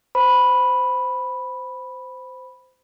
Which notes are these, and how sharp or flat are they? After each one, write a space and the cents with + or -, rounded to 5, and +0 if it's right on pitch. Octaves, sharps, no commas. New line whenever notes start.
C5 -15 B5 -5